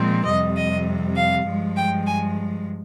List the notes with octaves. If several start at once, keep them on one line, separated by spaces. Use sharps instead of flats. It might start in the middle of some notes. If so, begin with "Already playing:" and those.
Already playing: A#2 F3 G#3 C4
F2 C3 G3 D#5
D#5
F5
G2 F3 G#3
G5
G#5